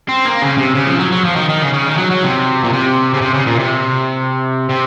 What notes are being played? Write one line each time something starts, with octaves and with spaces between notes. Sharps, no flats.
C4
A#3
C#3
C3
C#3
F3
F#3
F#3
F3
D#3
D#3
C#3
C#3
D#3
F#3
F#3
C3
A#2
C3
C#3
C3
C#3
A#2
C3
C3